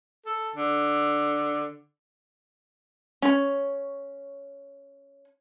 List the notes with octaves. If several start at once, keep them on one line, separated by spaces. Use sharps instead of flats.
A4
D3
C#4 C#5